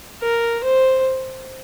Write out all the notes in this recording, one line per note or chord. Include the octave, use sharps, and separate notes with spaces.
A#4
C5